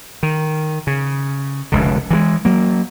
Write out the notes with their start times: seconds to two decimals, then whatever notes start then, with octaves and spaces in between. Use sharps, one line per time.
0.23 D#3
0.87 C#3
1.72 F1 C#2 D3
2.11 E3 F3 G#3
2.45 F#3 A#3